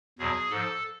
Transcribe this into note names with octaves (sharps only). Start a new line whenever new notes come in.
E2 B2 F#3 G#4
G#2 F3 A4